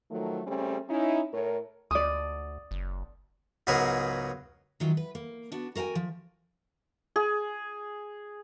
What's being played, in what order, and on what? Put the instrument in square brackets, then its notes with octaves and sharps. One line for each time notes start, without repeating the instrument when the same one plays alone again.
[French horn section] D#3 F3 F#3 A3
C#3 G3 A3 C4 C#4
C#4 D#4 E4
A2 A#4 C#5
[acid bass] D2 [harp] D5 D#6
[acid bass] F#1
[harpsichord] C#2 G#2 F#3 B3 G#4 A#4
[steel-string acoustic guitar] D#3 E3 F#3 F4
B4
A#3
B3 D4 F#4
F#4 A#4 F5 G5 G#5
F3
[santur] G#4